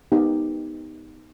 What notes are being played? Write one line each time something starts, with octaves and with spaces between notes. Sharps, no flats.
B3 D#4 G4